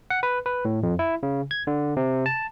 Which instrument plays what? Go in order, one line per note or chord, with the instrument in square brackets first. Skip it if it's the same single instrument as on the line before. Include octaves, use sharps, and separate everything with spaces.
[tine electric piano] F#5
B4
B4
A2
F2
E4
C#3
G#6
D3
C3
A5